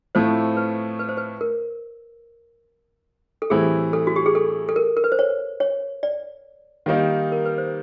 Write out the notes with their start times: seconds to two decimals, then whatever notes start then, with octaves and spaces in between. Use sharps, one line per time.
0.15 A2 F3 A3 C4 E4 C5
0.57 B4
0.99 B4
1.09 C5
1.17 B4
1.41 A#4
3.42 A4
3.50 A2 E3 G3 C4 E4 G#4
3.93 A4
4.07 F#4
4.16 G4
4.26 G#4
4.35 A4
4.69 A4
4.76 A#4
4.97 A#4
5.04 B4
5.12 C5
5.19 C#5
5.60 C#5
6.03 D5
6.86 D#3 G3 A#3 D#4
7.32 A#4
7.45 B4
7.58 C5